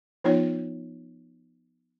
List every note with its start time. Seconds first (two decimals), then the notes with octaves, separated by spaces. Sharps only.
0.24 F3 B3 D#4 F4 C#5